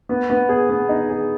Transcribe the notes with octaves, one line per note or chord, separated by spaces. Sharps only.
B3
B3
G#4
B3
D#4
G#4